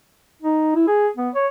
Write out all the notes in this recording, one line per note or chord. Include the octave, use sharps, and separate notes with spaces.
D#4
E4
G#4
B3
C#5